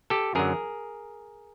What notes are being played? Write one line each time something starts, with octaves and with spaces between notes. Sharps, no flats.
G4 A4
F#2 D3 F#3 G#4 A#4